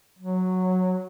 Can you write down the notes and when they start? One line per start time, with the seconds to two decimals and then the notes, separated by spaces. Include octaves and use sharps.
0.19 F#3